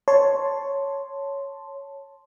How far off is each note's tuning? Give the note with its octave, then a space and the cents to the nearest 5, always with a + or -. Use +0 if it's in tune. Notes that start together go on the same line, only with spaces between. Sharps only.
C#5 +0 A5 +0 C6 +0